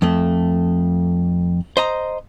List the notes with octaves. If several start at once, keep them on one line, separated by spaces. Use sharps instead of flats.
F2 A3
C5 D#5 A#5